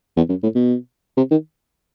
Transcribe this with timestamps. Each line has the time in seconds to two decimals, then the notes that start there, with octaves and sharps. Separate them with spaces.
0.17 E2
0.29 F#2
0.43 A2
0.55 B2
1.17 C3
1.31 D#3